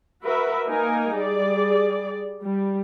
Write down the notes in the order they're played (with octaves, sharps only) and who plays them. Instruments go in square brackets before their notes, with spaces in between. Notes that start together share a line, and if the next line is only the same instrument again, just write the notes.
[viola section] F#4 A#4 B4 E5
A#3 D#4 A#4 G#5
G3 G#4 D5
G3